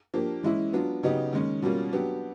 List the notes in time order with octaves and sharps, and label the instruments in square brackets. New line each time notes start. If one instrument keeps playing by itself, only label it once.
[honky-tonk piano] F3 A#3 D4 G4
E3 G#3 C#4 E4
F#3 B3 D4 F4
C#3 F#3 B3 D#4 G4
D#3 G#3 C#4
B2 G3 A#3 C#4 F4
F#3 B3 D4 G4